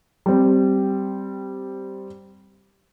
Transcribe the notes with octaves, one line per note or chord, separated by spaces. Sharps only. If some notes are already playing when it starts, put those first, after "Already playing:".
G3 C4